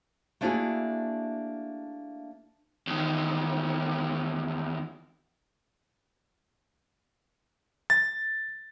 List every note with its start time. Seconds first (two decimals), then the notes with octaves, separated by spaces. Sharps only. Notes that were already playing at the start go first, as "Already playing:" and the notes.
0.41 A3 A#3 D4 E4 F#4 G#4
2.87 E2 D#3
7.90 A6